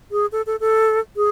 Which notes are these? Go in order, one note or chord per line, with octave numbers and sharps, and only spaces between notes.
G#4
A4
A4
A4
G#4